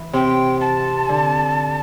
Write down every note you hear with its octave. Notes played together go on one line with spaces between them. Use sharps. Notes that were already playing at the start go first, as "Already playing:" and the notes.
Already playing: E3
C3 G5
A5
D3